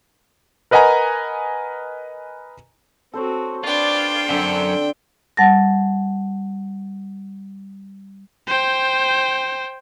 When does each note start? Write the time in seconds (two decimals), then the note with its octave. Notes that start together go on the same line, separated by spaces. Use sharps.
0.71 A#4 B4 D#5 F#5 G#5 A#5
3.13 C4 F#4 A4 C5 C#5
3.64 D4 F4 B4 D5 G5
4.28 F#2 D3 C4 A4
5.37 G3 F#5 A5 A6 A#6
8.48 C5 G5